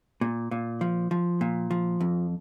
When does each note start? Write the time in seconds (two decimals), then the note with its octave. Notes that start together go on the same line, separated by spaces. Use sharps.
0.21 A#2
0.51 A#2
0.81 F3
1.11 F3
1.41 A#2
1.71 F3
2.00 F2